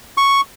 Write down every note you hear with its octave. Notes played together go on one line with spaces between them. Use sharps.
C#6